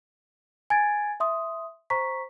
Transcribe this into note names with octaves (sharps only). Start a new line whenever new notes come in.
G#5 G#6 A6 D7
E5 C6 D#6
C5 A#5 C#6 B6